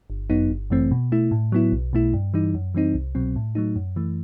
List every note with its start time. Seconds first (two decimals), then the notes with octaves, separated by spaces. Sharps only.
0.10 G1
0.30 F#2 F#3 B3 D#4
0.50 G1
0.70 F#2 E3 A3 C4
0.91 B2
1.12 A3 E4
1.31 A2
1.52 F#3 B3 E4
1.72 B1
1.93 B2 A3 E4
2.13 G2
2.34 E3 G3 D#4
2.55 F#2
2.74 E3 G3 C4 D#4
2.94 C2
3.15 B2 F#3 C4
3.36 A2
3.55 F#3 A3 D#4
3.76 F#2
3.96 E3 A3